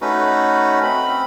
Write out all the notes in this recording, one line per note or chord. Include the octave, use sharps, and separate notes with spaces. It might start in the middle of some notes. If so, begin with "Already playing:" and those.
A3 C#4 D#4 F#4 B4
C4 B5